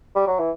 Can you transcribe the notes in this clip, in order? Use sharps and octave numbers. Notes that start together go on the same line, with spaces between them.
G3
F#3
E3